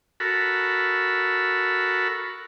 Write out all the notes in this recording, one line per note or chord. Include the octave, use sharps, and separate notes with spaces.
F#4 A4 A#4 B5